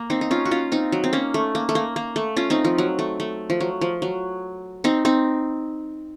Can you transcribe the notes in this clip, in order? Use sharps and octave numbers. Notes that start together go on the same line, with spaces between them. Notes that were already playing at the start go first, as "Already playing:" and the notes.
Already playing: A#3
C4 D#4
D#4
C#4 F4
F#4
C#4 F4
C4 D#4
F#3
C4
A#3 C#4
A3
A#3
A3
A#3
A#3
A3
C#4 F4
C4 D#4
F3
F#3
A3
A3
F3
F#3
F3
F#3
C4 D#4
C4 D#4